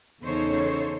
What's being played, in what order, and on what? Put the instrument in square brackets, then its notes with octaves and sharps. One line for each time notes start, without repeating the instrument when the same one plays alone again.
[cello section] E2 C#3 D#4 A4 C5 C#5